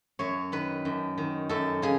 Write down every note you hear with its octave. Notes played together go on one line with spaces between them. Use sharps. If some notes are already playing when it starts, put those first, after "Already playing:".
F#2 C#5
D#3 B4
F#2
D#3
F#2 A4
C#3 G#4